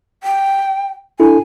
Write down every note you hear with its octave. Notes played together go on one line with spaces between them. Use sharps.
G5
D4 E4 A4 G#5